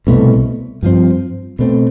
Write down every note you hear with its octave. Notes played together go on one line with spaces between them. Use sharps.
C2 B2 A3
G2 F3 C4
B2 A3 C4